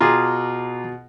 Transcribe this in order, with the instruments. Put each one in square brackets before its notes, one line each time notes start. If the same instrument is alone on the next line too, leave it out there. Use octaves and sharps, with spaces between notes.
[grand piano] B2 [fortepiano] F4 G#4 [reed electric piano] A#5 C6 D6